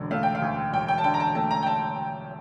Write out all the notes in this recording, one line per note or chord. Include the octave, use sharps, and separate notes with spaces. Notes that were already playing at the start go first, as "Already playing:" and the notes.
Already playing: E1 D3
A3 F5
G5
F5
D2
E1 G5
G5
A5
D3 G5
A#5
A5
A3 A5
A#5
G5
A5